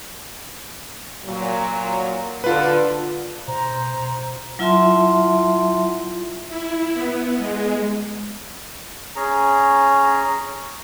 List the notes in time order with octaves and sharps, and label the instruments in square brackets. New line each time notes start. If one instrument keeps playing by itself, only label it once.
[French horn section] A#2 F#3
[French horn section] D3 [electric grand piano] F4 B4
[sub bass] B2 [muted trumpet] C5 [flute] A#5
[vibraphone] F#3 E4 F4 E5 A5 C6
[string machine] E4
B3
G#3
[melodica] C#4 G#4 A#5